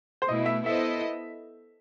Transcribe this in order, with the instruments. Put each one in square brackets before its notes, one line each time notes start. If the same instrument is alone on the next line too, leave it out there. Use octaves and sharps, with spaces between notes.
[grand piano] C5
[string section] B2 A3 E4 [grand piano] D#5
[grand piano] E5
[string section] B3 E4 A4 C5 D#5 [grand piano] E5